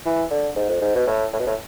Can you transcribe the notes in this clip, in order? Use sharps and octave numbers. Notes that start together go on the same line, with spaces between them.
E3
D3
G#2
F2
G#2
B2
A2
A2
B2
A2